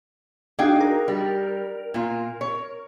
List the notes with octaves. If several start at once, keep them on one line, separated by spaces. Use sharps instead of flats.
D4 D#4 F#4 G#4 F5 G5
A#4
G3
A#2 F4
C#5